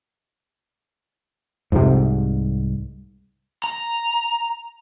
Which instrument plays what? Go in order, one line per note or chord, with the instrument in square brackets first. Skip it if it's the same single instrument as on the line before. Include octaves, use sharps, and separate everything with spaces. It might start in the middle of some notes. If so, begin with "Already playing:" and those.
[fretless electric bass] C2 G#2 [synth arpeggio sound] F2 C3
[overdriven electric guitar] A#5